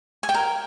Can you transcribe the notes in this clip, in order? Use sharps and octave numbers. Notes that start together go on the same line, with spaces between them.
G#5
G5
A#4